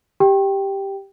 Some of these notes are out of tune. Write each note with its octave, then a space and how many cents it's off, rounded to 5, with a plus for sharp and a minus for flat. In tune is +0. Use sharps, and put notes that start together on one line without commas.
G4 +0 G5 +0